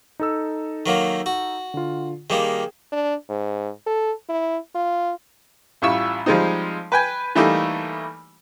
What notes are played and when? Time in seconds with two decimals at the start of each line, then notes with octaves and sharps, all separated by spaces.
0.20 D#4 A4 E6
0.86 D#3 F#3 A#3
1.26 F#4
1.74 D3 F4
2.30 D#3 G3 A#3 G#4 G5 E7
2.92 D4
3.29 G#2
3.86 A4
4.29 E4
4.75 F4
5.82 A1 G3 E4 F4 C#6 E6
6.26 F3 G3 G#3 C4 D#4
6.92 B4 G5 G#5
7.35 E3 G3 A3 A#3 D#4